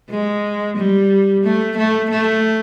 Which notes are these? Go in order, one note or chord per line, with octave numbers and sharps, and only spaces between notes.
G#3
G3
A3
A3
A3